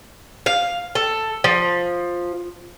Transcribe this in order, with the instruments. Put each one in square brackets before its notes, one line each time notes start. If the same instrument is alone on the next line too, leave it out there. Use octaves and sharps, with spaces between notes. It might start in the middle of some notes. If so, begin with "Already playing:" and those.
[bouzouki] F5
A4
F3